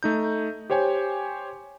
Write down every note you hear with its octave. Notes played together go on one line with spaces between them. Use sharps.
A3 D#4 G6
G4 C5 C#5 G5 G#5